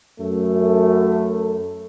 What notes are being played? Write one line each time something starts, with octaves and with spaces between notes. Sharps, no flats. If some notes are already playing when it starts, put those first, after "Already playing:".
F#2 A3